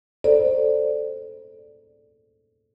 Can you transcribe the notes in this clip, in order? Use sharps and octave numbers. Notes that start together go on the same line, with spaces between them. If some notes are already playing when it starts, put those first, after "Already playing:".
A4 C5 D5